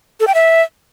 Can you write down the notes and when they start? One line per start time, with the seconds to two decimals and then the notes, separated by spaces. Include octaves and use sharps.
0.20 A4
0.27 G5
0.35 E5